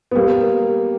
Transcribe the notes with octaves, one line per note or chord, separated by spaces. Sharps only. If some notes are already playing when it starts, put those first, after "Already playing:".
B3
G3 A#3